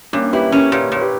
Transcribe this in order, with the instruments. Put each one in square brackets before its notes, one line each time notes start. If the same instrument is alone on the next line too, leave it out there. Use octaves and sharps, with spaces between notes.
[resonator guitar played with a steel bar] G2 [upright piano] A#3 C#4
[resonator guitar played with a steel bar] E4 [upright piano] G4 B4
[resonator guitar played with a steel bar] C#4 [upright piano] A#4 C#5
[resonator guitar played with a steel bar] A#2 [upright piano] G4 B4
[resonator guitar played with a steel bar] A#2 [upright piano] C#5
[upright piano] G4 B4